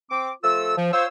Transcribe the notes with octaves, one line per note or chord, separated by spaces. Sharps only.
C4 D6
F3 A3 F4 A4 E6
F3
F4 C5 C#5 E6